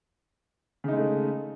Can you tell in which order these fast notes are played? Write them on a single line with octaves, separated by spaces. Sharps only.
C#3 D#4 G#3 A3